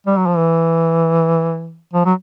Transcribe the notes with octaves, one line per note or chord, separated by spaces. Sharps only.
G3
F#3
F3
E3
F3
F#3